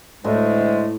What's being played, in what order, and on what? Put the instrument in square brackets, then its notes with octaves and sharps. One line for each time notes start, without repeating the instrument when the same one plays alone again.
[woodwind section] D2 G#3 A3 [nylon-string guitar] A2